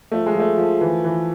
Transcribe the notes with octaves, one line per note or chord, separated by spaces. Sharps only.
F3 A3
G#3
F3
A3
F3
E3
E3